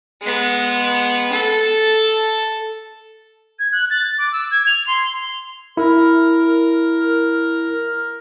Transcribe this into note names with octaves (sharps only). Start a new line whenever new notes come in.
G#3 B3
A4
G#6
F#6
A6
D6
E6
G#6
F7
C6
E4 A#4